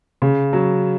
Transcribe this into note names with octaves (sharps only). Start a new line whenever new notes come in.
C#3
F#3